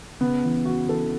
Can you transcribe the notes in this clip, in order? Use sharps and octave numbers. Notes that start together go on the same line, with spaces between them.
C#3 B3
E3
E3 F#4
E3 A4